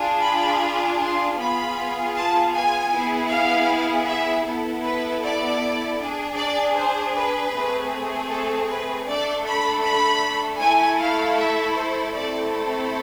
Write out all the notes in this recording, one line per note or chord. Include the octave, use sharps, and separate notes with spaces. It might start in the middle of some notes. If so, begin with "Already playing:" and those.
Already playing: D4 F4 G#4
B5
C6
B3 F4 G#4 B5
A5
G#5
B3 E4 G#4
F5
E5
B3 E4 A4
B4
D5
D4 G#4
D5
C5
B4
A3 C4 G#4
A4
B4
A3 D4 A4 D5
B5
B5
A3 E4 A4 G#5
F5
E5
C5
A3 C4 E4 A4 D5